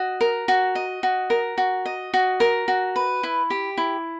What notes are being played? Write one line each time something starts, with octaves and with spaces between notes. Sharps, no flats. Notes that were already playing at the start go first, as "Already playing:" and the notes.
Already playing: F#4 D#5
A#4
F#4
D#5
F#4
A#4
F#4
D#5
F#4
A#4
F#4
B4
E4
G4
E4